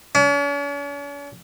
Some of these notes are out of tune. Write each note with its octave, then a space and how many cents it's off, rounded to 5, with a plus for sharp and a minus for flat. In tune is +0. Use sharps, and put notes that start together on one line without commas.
C#4 +45